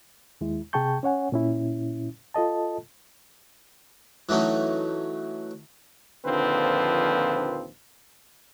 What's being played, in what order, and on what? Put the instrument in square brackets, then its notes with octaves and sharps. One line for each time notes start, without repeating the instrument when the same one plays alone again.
[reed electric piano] D#2 G#3 E4
C3 G#4 G5 A5 C#6 G6
C#4 C#5 F#5 G#5
A#2 C#4 E4
F4 A4 D#5 A5
[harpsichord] E3 F#3 A3 C#4 D#4
[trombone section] A#1 D#2 D3 F3 C4 B4